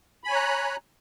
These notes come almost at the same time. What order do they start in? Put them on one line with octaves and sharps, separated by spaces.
B5 G#5 C#5 A#5 F#6